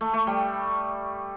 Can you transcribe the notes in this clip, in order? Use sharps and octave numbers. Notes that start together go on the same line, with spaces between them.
A3
A3
G3